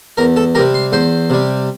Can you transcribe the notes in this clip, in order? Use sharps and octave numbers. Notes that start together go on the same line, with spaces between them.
E2 A#4 A#5
A4 A5
C3 G3 A#4 A#5
C6
E2 C5 C6
C3 G3